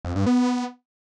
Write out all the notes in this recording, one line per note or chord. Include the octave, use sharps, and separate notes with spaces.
F2
G2
B3